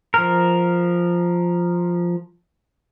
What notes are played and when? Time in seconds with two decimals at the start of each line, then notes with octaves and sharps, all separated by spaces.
0.14 F3 A#4